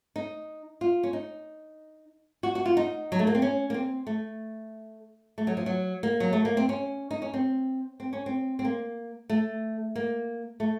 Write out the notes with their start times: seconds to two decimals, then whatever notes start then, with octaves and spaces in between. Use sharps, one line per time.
0.16 D#4
0.81 F4
1.03 C#4
1.13 D#4
2.43 F#4
2.55 F#4
2.66 F4
2.77 D#4
3.12 F#3
3.19 A3
3.27 A#3
3.35 C4
3.42 C#4
3.70 A#3
3.74 C4
4.07 A3
5.38 A3
5.47 F#3
5.57 F3
5.66 F#3
6.03 A#3
6.20 F#3
6.33 A3
6.45 A#3
6.57 C4
6.69 C#4
7.11 D#4
7.22 C#4
7.34 C4
8.00 C4
8.13 C#4
8.26 C4
8.59 C4
8.65 A#3
9.30 A3
9.96 A#3
10.60 A3